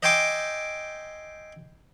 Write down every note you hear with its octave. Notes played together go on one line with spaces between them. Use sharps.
D#5 E5 G5 G#5 C6 D6